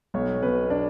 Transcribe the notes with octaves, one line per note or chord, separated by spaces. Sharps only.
B1 C#5
B2 B4
D4